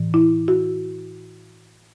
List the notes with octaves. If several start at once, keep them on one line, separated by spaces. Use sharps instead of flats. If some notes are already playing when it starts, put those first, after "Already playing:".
Already playing: A2 E3
E4
F#4